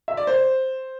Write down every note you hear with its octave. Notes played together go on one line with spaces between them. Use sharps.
E5
D5
C5